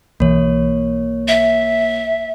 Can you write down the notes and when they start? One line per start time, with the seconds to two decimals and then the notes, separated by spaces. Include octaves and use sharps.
0.20 B1 E3 A#3 C#5
1.28 E5